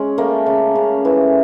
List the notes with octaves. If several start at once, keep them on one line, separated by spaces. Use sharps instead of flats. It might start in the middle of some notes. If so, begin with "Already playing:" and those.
Already playing: G#3 C#4
A3 A#3
C#3
C#3
E3